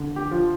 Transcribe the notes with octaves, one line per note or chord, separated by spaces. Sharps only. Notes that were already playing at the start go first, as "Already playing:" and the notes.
Already playing: D3
G4
F3